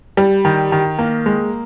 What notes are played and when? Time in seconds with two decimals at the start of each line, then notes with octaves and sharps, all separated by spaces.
0.17 G3
0.45 D#3
0.72 D#3
0.98 A#3
1.26 G#3